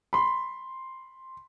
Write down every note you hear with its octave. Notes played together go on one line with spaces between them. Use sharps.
B5 C6